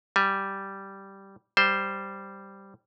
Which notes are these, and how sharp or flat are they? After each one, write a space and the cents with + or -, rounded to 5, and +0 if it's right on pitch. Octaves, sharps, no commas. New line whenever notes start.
G3 -5 G#5 +0
G3 +0 C5 +0